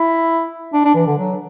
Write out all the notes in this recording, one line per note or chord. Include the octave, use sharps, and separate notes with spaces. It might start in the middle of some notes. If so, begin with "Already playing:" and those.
Already playing: E4
D4
D4
E3
D3
F#3